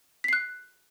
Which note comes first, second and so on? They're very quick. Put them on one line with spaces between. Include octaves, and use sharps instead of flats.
B6 C7 F#6